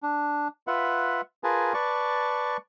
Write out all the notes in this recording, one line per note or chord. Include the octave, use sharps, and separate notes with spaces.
D4
F4 B4 E5 F#5
F4 G#4 A#4 B4 G#5 A5
B4 D5 A5 C#6